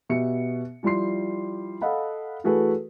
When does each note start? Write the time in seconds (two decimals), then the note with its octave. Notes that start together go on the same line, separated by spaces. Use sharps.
0.09 B2 B3 G4 E5 C#7
0.83 F3 G3 E4 C6 C7
1.82 A4 D#5 F5 F#5 B5
2.44 E3 A3 F#4 G#4 A4 B4